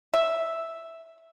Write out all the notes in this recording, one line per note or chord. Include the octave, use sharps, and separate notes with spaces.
E5